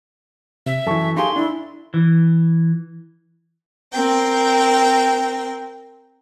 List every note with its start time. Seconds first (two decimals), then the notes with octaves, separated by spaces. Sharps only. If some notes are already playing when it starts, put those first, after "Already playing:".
0.66 C3 E5
0.86 F#2 E3 A4 A5 C#6
1.17 D#4 G4 G#4 F5 C6
1.36 D4 E4
1.94 E3
3.92 C4 A#4 G5